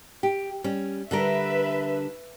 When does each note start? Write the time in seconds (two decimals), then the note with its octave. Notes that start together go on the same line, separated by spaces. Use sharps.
0.23 G4
0.64 G3 C#4
1.11 D3 G3 A#4 B4 E5